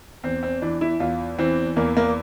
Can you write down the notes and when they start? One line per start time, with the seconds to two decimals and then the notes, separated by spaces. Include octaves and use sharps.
0.24 E2 C4
0.43 C4
0.62 E3 D4
0.81 E4
1.00 E2 F4
1.39 E3 C4
1.76 E2 A#3
1.97 A#3